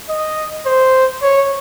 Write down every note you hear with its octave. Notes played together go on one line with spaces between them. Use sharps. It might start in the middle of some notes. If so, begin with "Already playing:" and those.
D#5
C5
C#5